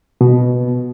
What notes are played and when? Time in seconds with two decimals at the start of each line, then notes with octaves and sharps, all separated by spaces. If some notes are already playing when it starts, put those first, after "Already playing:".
0.21 B2